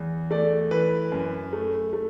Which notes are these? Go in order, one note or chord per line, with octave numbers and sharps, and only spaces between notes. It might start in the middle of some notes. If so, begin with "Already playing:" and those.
Already playing: E2
A3 D5
E3 B4
F#2
A3
A3